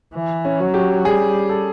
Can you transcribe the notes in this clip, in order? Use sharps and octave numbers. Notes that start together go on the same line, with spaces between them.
E3
C#4
F#3
G4
G3 G#4
A4